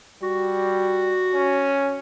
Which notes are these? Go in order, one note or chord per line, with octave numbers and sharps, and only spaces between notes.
G3 F#4
C#4